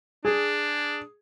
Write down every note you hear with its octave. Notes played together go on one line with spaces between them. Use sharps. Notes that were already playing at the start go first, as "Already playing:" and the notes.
D4 G#4